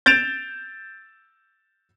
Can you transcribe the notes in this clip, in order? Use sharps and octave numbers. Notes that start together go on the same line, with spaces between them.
G6 A6 D7 E7 F7